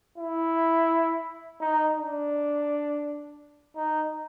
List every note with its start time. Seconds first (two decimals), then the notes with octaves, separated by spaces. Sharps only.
0.18 E4
1.61 D#4
1.97 D4
3.76 D#4